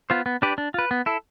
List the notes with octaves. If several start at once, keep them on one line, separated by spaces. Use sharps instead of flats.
B3 F4 C5
B3
D4 G4 B4 D5
D4
F4 B4
B3
E4 A4